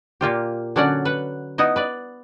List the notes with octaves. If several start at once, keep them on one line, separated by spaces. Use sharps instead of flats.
A#2 A#3 F4 G4
D3 F#3 C#4 D5 F#5
B4 F#5
B3 D#4 E4 D#5
B4 D5